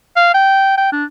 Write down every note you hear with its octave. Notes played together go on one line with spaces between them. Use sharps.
F5
G5
G5
D4